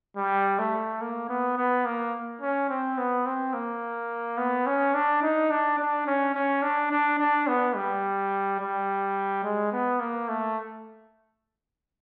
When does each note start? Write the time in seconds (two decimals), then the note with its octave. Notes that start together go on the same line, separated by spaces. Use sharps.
0.16 G3
0.58 A3
1.01 A#3
1.29 B3
1.57 B3
1.85 A#3
2.41 C#4
2.69 C4
2.98 B3
3.26 C4
3.54 A#3
4.38 B3
4.66 C#4
4.94 D4
5.22 D#4
5.50 D4
5.79 D4
6.07 C#4
6.35 C#4
6.63 D4
6.91 D4
7.19 D4
7.47 B3
7.76 G3
8.60 G3
9.44 G#3
9.72 B3
10.00 A#3
10.28 A3